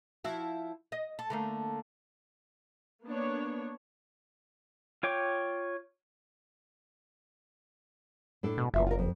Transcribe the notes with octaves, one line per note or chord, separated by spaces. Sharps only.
F3 E4 F#4
D#5
A4
D3 A3 A#3
A#3 B3 D4 C#5
F4 C#5 G5 D6
A2 D4 A4
B2
F#1 E2 F4 E5
F4 A#4
F2